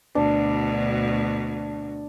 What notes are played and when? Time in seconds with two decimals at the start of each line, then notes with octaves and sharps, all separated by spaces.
0.15 D2 B2 D4